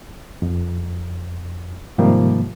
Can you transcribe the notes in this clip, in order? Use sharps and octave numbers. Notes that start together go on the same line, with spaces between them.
F2
G#2 C3 D#3 F3 G3 A#3